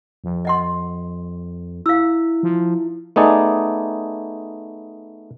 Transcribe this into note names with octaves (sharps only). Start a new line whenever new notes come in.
F2
D#5 F#5 C6
E4 F5 E6
F3
A3 B3 D#4 G#4 D5